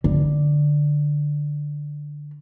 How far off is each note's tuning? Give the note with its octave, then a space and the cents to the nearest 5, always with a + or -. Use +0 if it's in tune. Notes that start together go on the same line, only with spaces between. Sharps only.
D3 +5